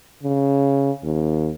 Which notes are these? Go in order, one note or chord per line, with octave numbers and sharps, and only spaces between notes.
C#3
D#2